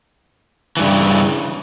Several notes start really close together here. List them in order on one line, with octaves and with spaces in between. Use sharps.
E3 G2 C#3